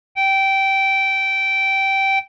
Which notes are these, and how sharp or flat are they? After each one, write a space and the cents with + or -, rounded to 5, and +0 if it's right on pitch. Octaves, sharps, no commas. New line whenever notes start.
G5 -15